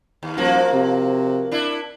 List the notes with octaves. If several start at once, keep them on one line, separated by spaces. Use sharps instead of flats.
D#2
D#1 F3 A#3 F#4
C3
D4 E4